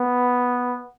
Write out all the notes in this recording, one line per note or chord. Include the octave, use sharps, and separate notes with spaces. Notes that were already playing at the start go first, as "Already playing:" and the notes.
Already playing: B3